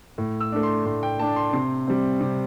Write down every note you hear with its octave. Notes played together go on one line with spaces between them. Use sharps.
A2
E6
A3 D4
C6
A2 C6
G5
A3 D4 A5
C6
C3 C6
G3 C4
C3